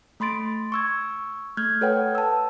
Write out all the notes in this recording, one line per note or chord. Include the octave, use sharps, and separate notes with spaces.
A3 B5 C6 A6 D7
C#6 E6 G#6
A3 F6 G6 G#6
A4 B4 C#5 F#5 G5
A5 E6